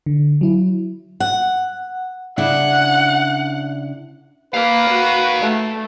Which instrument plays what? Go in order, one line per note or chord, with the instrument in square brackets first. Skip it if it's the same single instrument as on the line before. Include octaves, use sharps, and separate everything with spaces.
[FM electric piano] D3
F#3 E4
[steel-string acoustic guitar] F#5
[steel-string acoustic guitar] C#3 D4 E4 [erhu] F#5
[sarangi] A#3 [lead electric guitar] D#4 F5 [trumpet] B4
[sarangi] F#4
A3